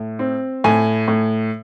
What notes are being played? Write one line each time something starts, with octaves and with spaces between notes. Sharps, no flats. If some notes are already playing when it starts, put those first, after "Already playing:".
Already playing: A2
C4
A2 G#5
A2